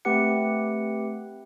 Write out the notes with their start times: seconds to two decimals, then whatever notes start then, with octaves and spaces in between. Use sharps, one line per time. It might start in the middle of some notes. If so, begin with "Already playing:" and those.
0.05 A3 C4 G4 B4 F#5 C#7